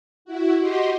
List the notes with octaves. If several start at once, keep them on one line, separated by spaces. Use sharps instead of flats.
E4 F#4
F#4 G4 D#5 C6